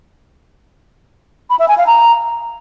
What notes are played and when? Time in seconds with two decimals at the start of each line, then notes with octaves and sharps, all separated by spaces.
1.50 B5
1.59 E5
1.68 G#5
1.78 F5
1.87 A#5